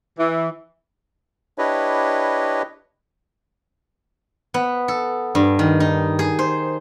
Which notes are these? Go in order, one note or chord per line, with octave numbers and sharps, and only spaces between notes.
E3
D4 E4 G4 B4 C#5 D#5
B3
A4
G2
D#3
D#4
G#4
C5